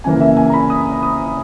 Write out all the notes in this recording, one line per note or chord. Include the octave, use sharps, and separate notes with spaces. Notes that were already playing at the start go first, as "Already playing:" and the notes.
C#3 E3 A#3 G#5
E5
G#5
A#5
B5
D#6
D#6